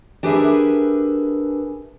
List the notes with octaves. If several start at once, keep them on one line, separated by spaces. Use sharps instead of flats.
D4 G4 G#4 A#4 B4 E5